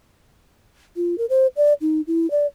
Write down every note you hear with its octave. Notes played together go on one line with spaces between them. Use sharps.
F4
A#4
C5
D5
D#4
E4
D5